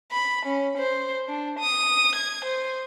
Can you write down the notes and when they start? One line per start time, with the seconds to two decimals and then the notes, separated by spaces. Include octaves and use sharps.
0.12 B5
0.46 C#4
0.78 C5
1.29 D4
1.60 D#6
2.16 G#6
2.45 C5